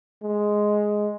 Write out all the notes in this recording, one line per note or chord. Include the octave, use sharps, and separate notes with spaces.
G#3